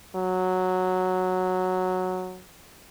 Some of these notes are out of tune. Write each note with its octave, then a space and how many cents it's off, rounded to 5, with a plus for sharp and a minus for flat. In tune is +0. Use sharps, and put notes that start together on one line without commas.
F#3 -5